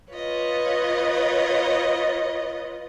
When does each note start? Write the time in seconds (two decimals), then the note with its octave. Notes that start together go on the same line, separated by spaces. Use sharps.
0.11 F4 B4 C#5 D#5